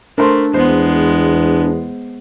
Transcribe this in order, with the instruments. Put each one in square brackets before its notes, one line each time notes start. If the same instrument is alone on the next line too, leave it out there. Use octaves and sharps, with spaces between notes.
[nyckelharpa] A3 [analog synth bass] D4 [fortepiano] A#4 C5 C6
[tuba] E2 [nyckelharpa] G#3 B3 [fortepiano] C5